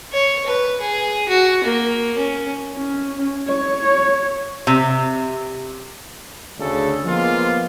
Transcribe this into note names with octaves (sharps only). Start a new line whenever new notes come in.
C#5
B4
G#4
F#4
A#3
C#4
C#4
C#5
C3
D2 C#3 D4 G#4 A4
F3 G#3 A#3 B3 F4